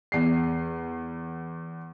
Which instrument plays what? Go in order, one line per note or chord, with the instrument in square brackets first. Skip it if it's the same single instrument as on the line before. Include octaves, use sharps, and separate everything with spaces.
[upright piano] E2 C7